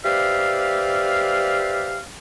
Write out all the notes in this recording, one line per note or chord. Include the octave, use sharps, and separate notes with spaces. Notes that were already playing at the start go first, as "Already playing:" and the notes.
G4 B4 C5 D5 E5 F5